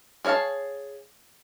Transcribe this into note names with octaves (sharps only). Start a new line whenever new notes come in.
G#4 C#5 D#5 F5 A5